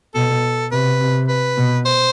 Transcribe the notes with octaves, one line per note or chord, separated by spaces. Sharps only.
B2 A4
C3 B4
C3
B4
B2
C5